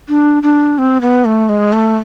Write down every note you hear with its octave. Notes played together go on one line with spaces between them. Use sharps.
D4
D4
C4
B3
A3
G#3
A3